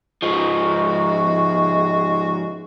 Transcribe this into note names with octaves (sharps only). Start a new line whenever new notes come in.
G#2 F3 G#3 F#4